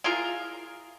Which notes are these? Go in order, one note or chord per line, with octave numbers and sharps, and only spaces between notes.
E4 F4 G#4 A#4